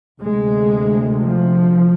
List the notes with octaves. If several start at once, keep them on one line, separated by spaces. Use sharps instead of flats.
D2 C3 G#3
F3